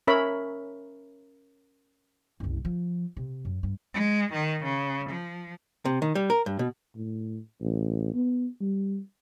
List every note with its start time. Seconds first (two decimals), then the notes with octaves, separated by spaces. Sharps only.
0.07 C#4 A#4 C#5 E5 B5
2.40 F#1 C2
2.65 F3
3.17 C3
3.45 F#2
3.63 G2
3.94 G#3
4.33 D#3
4.64 C#3
5.10 F3
5.85 C3
6.02 D#3
6.15 G3
6.30 A#4
6.46 G2
6.59 B2
6.96 A2
7.61 A1
8.14 B3
8.61 G3